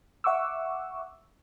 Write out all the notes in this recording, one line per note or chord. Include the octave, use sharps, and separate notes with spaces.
E5 F#5 C#6 D6 E6